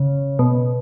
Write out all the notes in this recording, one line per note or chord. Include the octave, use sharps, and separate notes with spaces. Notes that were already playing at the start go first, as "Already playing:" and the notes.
Already playing: C#3
B2